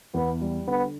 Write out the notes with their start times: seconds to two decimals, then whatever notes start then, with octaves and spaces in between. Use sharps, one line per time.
0.14 E2 B3
0.41 G3
0.67 D3 B3